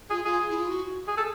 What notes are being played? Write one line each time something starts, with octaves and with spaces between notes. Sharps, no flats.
F4 G#4
F4 G#4
E4
F4
F#4
G#4
A4